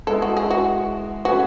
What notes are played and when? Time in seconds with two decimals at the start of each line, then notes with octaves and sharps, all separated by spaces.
0.07 G#3 B3 E4 A4
0.22 F#4
0.37 G#4
0.51 F#4
1.25 A3 C#4 F#4 G#4 B4